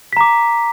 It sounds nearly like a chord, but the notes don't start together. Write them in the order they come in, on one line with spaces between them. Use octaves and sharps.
B6 A#5 D6